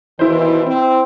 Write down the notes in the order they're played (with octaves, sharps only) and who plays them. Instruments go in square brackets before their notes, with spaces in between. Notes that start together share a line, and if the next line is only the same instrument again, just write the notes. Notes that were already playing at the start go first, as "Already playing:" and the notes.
[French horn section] D#2 B2 E3 [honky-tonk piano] E4 C5
[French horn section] C4